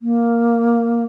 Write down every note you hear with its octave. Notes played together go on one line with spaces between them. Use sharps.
A#3